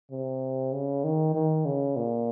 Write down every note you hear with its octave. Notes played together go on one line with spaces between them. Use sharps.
C3
C#3
D#3
D#3
C#3
A#2